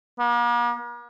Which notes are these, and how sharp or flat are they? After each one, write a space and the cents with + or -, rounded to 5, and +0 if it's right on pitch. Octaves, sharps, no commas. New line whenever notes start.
A#3 +45